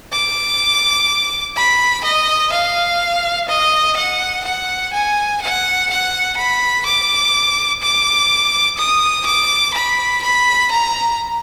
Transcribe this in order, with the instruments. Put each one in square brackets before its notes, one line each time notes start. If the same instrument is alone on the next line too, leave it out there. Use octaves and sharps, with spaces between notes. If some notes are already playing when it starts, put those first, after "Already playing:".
[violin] D6
B5
D#5
F5
D#5
F#5
F#5
G#5
F#5
F#5
B5
D6
D6
D#6
D6
B5
B5
A#5